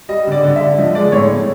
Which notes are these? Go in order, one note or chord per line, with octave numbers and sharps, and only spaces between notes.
G3 D#5
D3 D5
D3
E5
D3
F3 D#5
G#3 D5
A2 C#5
A2